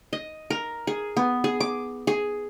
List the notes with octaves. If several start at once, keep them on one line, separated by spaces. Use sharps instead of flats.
D#5
A#4
G#4
B3
G#4
D6
G#4